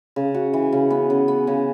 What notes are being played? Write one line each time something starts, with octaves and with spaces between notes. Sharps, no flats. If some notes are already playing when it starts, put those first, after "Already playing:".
C#3
F#4
E3
C#3
B3
C#3
B3
C#3